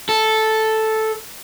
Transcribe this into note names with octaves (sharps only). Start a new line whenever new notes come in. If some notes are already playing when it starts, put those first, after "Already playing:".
A4